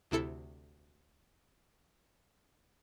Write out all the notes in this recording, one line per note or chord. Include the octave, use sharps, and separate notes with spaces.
D2 C3 E4 A4 C#7